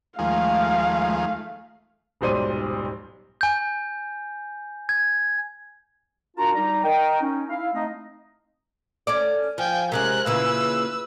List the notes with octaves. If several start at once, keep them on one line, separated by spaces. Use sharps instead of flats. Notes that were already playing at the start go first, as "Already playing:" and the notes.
D#2 F3 G#3 A3 F5
D#1 B1 G#2 C5 D5 D#7
G#5 G6
G#6
D4 F4 F#4 A#4 A5 A#5
G3 D#4 A#5
A#4 D#5 G5
C#4 D#4
E4 F5
A3 C4 D#4 D#5
C#4 A4 D5
F3 G5 G#5
C3 G#3 C#4 A#4 F#6
A#2 C#3 E3 B4 E6